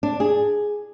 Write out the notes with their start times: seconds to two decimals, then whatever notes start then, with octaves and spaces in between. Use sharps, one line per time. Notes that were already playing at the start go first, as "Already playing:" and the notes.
0.03 D4
0.20 G#4